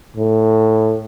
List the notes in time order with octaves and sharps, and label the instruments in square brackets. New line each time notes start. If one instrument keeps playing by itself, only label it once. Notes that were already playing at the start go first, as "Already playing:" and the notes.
[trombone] A2